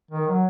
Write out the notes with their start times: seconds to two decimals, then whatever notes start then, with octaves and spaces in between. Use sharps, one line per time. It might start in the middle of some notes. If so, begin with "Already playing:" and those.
0.11 D#3
0.27 F#3